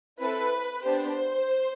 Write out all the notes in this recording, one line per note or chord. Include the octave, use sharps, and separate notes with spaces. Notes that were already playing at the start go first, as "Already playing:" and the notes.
C4 E4 A4 B4
B3 D4 G4 C5